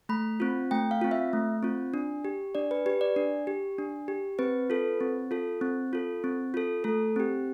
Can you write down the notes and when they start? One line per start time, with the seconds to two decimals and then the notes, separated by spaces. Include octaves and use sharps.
0.09 A3 B5
0.40 C4 F4
0.71 A3 G5
0.91 F5
1.01 C4 F4
1.11 E5
1.33 A3
1.63 C4 F4
1.94 D4
2.25 G4
2.55 D4 D5
2.71 B4
2.86 G4 B4
3.01 D5
3.16 D4
3.47 G4
3.78 D4
4.08 G4
4.39 C4 B4
4.70 F4 A4
5.01 C4
5.31 F4 A4
5.61 C4
5.93 F4 A4
6.24 C4
6.54 F4 A4
6.84 A3 A4
7.16 C4 G4